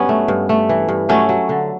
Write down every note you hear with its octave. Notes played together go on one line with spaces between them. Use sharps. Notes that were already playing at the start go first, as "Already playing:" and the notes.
Already playing: G2 F#3 B3 C#4
A3
G2
A3
E3
G2
F#3 A3 C#4
F#3
D3